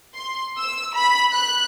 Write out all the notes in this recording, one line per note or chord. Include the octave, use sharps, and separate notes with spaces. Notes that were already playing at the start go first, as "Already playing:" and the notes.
C6
E6
B5
F#6